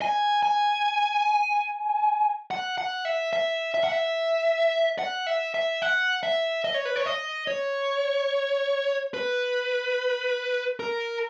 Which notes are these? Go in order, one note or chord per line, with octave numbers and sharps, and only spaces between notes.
G#5
G#5
F#5
F#5
E5
E5
E5
F#5
E5
F#5
E5
E5
F#5
E5
D#5
C#5
B4
C#5
D#5
C#5
B4
A#4